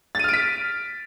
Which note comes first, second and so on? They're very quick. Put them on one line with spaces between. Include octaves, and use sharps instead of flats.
A6 D#7 F6 D7 B6